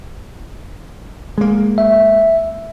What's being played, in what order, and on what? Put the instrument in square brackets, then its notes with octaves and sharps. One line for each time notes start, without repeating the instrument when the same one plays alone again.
[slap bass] G#3 A#3
[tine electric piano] E5